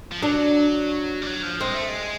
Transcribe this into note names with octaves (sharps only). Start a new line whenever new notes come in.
F3
F#3 D4
G3
F#3
F3
G#3 C4
A3
G#3